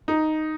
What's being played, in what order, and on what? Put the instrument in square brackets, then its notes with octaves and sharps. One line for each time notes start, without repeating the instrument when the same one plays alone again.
[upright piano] D#4